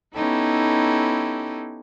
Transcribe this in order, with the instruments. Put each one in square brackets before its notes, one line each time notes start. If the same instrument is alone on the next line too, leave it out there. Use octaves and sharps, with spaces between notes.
[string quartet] B3 C#4 D#4 E4 G4 A4